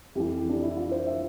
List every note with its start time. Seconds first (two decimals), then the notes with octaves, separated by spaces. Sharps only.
0.15 F2 E3 G4
0.49 D4
0.63 E4
0.77 F4
0.91 C5
1.07 E5